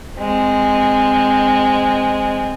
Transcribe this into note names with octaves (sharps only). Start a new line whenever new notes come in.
G#3 C4